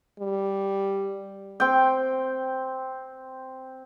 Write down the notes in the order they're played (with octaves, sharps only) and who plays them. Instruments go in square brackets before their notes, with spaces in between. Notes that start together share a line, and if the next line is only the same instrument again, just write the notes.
[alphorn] G3
[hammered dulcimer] C4 G5